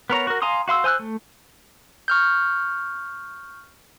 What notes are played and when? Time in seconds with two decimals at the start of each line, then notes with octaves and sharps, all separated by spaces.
0.10 B3 A#4 C#5 A#5
0.27 F#4 A#4
0.42 F5 G#5 A#5 C6 D#6
0.68 F#4 F5 C6 E6
0.84 C5 G#5 E6 F#6
0.99 A3
2.08 C#6 F6 G6